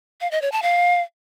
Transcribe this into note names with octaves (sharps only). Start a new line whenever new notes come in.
F5
D#5
C#5
A5
F5